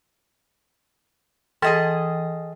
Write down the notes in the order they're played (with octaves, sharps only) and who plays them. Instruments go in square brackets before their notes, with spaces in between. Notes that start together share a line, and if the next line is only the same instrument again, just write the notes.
[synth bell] E3 [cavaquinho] G#4 D#5 A5